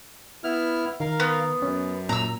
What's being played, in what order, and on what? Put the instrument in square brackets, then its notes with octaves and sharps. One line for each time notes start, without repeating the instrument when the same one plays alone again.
[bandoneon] B3 E4 F6
[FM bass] D#3 [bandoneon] A#4 F5
[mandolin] B3
[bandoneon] F#2 [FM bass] C#4
[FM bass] A#2 [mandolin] A#5 E6